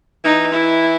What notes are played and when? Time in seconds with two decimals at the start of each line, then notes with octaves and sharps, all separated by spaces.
0.24 E3 D#4
0.53 E4